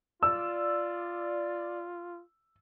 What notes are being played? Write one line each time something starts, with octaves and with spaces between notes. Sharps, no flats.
F4 D5 E6